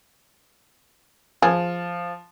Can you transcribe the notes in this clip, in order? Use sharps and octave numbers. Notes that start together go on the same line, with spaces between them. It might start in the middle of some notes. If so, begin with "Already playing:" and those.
F3 G#4